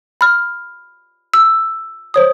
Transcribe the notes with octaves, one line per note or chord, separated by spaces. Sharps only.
B5 F6
E6
C5 C#5 D#6